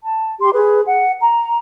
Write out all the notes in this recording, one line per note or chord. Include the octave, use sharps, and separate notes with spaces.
A5
G4 C6
G#4 B4
F#5
A#5